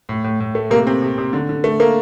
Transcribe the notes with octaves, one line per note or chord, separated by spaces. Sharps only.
A2
A2
A2
A3
C3 A#3
C3 C4
C3
C3
D3
D3
A3
A3 A#3